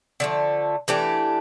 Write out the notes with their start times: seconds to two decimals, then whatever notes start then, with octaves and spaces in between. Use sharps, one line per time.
0.20 D3 F3 A3
0.88 E3 A3 D4 G4